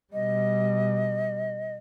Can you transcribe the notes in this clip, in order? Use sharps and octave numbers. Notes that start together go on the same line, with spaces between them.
B2 G3 D#5